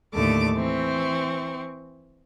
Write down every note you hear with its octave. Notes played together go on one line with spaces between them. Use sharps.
D#2 A2 D3 A3 A5 D6
E3 C4 C#6